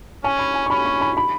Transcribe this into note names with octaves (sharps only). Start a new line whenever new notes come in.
C#4 G#5
B5
G#5
C#6
C#4 B5
C#6
B5
B5